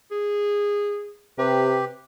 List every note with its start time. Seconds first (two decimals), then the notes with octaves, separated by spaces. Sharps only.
0.12 G#4
1.38 C3 G4 B4